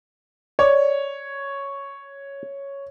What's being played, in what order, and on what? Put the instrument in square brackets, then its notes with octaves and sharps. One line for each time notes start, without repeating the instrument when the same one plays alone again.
[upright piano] C#5 [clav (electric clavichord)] D5